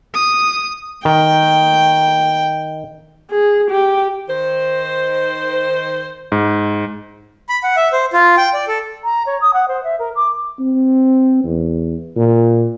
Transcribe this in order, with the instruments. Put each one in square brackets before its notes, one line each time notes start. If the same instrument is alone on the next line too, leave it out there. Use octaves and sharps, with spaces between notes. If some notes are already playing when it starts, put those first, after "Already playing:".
[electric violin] D#6
[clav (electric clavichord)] D#3 [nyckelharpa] G5
[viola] G#4
G4
[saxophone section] D#3 C5
[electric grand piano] G#2
[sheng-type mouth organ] B5
F#5
E5
C5
F4
G5
D5
A4
[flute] A#5
C#5
D#6
F#5
C5
E5
A#4
D6
[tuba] C4
E2
A#2